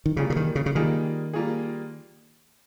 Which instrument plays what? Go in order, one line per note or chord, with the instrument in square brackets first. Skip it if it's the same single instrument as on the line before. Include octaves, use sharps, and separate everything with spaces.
[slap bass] D#3
[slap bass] C#3 [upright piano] G3 A#3 F4 G#4
[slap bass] C#3
D#3
C#3
C#3
[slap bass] D#3 [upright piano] G3 A#3 F4 G#4
[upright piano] G3 A#3 F4 G#4